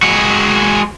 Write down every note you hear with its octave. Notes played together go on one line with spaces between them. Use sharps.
G#3 F#4